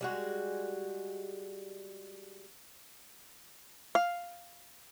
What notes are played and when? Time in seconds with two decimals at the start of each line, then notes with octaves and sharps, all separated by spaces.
0.01 G3 G#3 F#4
3.95 F5